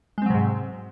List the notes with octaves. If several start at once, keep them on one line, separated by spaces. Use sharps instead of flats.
G#2 C3 F#3 G#3 C4